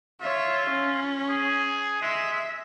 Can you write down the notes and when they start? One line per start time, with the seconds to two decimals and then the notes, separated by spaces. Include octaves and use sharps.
0.21 F4 C#5 E5
0.69 C#4
1.29 G#4
2.02 G#3 E5